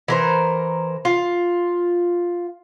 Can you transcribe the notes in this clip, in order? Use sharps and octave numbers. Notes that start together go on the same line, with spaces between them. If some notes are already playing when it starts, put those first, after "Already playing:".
E3 A#4 C5
F4